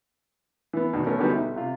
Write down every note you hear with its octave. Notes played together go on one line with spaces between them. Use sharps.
E3 B3
E2 B2 D#3
A3 B3 C#4 A#4
D3 F#3 G3 B3 C#4 D#4
B1 E5
C3 F4